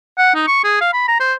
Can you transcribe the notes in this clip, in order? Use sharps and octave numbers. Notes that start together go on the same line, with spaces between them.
F#5
D#4
C#6
G#4
F5
B5
A#5
C5